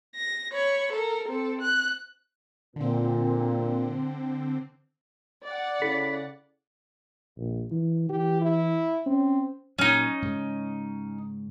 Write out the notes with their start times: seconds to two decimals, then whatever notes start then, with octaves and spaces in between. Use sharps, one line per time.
0.16 A#6
0.53 C#5 B5
0.93 A4 A#4
1.29 C4 A4
1.61 F#6
2.76 A#2 D3 C4
5.44 D5 F#5
5.82 C#3 E4 A4 B5
7.38 A#1
7.71 E3
8.09 E3 G4
8.42 E4
9.06 C4 C#4
9.79 A#2 F#3 C#4 D#4
10.22 G#2 C#3